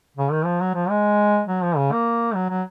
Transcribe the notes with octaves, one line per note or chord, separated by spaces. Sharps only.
C#3
D#3
F3
F#3
F3
G#3
F#3
F3
C#3
A#3
F#3
F#3